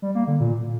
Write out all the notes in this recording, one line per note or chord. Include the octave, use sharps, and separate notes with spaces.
G3
A#3
D3
A#2